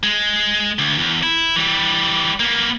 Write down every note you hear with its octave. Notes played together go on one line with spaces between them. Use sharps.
G#3
D2
E2
E4
E3 G3
A#3 B3